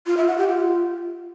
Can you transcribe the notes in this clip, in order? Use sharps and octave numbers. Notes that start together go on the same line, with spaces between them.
F4
E5
F#5
G4
F4